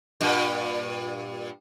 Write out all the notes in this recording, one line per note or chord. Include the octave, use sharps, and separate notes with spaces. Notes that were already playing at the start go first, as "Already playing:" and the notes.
G2 A#2